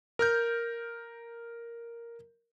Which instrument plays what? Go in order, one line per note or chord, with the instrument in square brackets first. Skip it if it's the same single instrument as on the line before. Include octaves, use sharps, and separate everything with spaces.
[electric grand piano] A#4 F6 G6